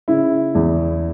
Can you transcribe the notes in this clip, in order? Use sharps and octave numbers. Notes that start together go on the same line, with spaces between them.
C#3 E4
E2